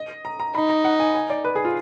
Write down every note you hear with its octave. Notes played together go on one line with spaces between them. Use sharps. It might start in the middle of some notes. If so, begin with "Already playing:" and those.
Already playing: D#5
A#5
A#5
D#4 B5
A#5
F#5
G#5
G#5
D5
B4
G#4
F4